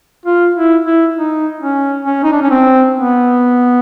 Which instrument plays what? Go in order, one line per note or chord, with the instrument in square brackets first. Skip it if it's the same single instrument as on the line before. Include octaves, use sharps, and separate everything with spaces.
[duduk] F4
E4
E4
D#4
C#4
C#4
D#4
D4
C#4
C4
B3